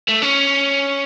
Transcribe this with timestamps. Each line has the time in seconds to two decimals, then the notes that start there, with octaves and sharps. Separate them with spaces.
0.09 A3
0.23 C#4